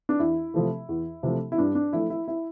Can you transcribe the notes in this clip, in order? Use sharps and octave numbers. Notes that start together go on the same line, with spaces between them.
D4
E2 E4
C3 F3 A3
E2
C3 F3 A3
E4
G2 D4
D4
F3 A3 E4
E4
E4